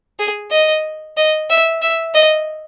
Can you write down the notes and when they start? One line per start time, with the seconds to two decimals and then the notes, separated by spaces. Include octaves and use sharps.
0.19 G#4
0.51 D#5
1.17 D#5
1.50 E5
1.82 E5
2.14 D#5